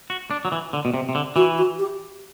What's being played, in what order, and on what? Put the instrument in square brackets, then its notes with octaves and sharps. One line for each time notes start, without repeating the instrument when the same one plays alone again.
[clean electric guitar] F#4
D4
F#3
E3
D3
B2
C3
C3
D3
[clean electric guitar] E3 [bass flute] F#4
[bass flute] F#4
G4